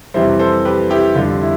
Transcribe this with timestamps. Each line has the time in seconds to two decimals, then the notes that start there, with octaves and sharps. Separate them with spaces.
0.14 F2 C3 E3 G3 C5 E5
0.39 A4 C5
0.65 G4 B4
0.90 E4 G4
1.15 F2 D3 G3 F4
1.42 E4